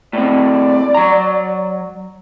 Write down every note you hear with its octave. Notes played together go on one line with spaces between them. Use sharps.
A2 C4 D5
F#3 A#5